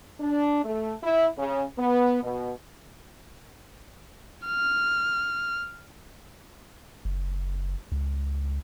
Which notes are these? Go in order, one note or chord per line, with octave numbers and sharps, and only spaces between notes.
D4
A3
E4
C#3
B3
B2
F6
F#1
C#2